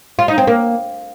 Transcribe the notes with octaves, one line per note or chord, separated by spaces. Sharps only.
F4
D#4
C4
A#3